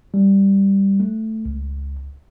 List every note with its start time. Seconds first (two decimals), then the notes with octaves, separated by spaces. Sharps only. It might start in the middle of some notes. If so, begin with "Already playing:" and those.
0.14 G3
1.00 A3
1.45 C#2